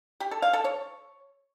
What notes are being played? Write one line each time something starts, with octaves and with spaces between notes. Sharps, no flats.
G4
A4
F5
A4
C#5